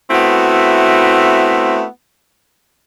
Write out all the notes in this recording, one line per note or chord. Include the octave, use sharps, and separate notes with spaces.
A3 B3 C4 E4 F#4